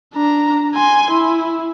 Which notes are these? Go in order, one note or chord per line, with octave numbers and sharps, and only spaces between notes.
D4 A#5
G#5 C6
E4